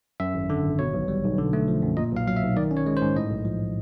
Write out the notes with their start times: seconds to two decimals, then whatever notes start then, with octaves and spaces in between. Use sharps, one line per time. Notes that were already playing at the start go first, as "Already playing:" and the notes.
0.20 F#2 E5
0.34 G#1
0.50 D3
0.64 G#1
0.79 B2 C#5
0.94 B1
1.08 G3
1.24 B1
1.38 D3
1.53 A3
1.68 F3
1.83 F#2
1.97 A#2 D#5
2.12 B1 F5
2.27 F#3 F5
2.36 E5
2.42 B1
2.57 D#3 D5
2.71 C#4
2.77 C#5
2.86 G#3
2.97 C5
3.02 G#2
3.16 A2 D#5
3.31 B1
3.45 F3